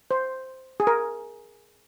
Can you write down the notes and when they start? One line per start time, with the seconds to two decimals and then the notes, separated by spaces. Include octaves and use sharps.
0.11 C5
0.80 G#4
0.87 A#4